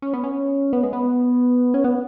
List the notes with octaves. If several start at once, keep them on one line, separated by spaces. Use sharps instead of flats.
C#4
B3
C#4
B3
G#3
B3
C#4
B3